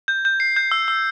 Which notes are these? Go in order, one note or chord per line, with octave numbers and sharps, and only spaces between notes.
G6
G6
C7
G6
E6
E6